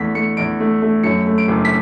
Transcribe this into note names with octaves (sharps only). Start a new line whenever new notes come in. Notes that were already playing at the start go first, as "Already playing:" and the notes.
Already playing: E2 A3 B6
A3 C#7
E2 D7
A3
A3
F#2 C#7
A3
D7
F#1
B6